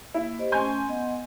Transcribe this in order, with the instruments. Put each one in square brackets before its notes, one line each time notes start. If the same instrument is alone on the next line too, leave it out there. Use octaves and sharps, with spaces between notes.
[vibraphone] A#3 [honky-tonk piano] E4
[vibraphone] G4 C5 D#5
[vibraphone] A3 C#4 [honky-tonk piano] G#5 C6 G6
[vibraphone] B3 D#5 F#5